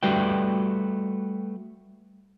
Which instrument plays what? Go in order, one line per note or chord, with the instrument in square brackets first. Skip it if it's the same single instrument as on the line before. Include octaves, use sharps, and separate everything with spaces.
[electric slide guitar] G3 A3 F#4 B4 D5 G5